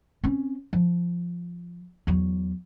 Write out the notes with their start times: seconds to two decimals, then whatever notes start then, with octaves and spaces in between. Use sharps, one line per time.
0.24 C4 C#4
0.73 F3
2.07 E2 F#3